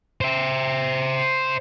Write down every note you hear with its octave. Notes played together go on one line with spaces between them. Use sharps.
C5 E5